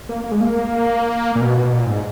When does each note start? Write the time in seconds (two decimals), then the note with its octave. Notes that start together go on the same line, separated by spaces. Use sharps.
0.09 A#3
0.24 A#3
0.32 G#3
0.41 A#3
1.36 A#2
1.41 B2
1.58 B2
1.73 A#2
1.86 G#2